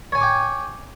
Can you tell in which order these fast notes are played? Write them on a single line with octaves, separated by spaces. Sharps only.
C#5 G#5 C#6 D6 G5